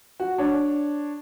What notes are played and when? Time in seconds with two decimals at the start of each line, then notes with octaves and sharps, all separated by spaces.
0.20 F#4
0.38 D4 C#5